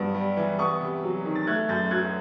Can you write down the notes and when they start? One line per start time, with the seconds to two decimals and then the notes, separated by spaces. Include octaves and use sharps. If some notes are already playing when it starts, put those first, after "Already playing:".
Already playing: G2 F#3 B3
0.14 G3
0.37 E3
0.59 B3 C#6 D#6
0.81 C3
1.03 F#3
1.25 D#3
1.36 A6
1.47 A3 F#6 G#6
1.69 F#2 G6 A6
1.91 F#3 F#6 G#6